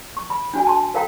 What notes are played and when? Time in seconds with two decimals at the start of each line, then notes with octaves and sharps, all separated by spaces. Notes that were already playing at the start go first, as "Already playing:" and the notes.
0.17 C#6
0.30 B5
0.54 D4 F#4 G#5
0.67 A5 C6
0.94 A4 A#4 F5 G5 A#5